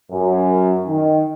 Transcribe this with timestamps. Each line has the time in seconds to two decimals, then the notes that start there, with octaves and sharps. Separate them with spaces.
0.11 F#2
0.87 D#3